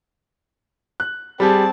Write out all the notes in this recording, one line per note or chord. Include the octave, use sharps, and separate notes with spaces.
F#6
G3 C4 G4 G#4 A5